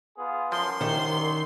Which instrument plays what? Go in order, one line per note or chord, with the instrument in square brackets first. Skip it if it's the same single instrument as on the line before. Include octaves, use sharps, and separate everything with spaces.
[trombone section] B3 F4 G#4
[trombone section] F#2 [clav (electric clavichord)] F3 [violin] C6
[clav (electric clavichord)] C2 [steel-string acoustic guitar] D#3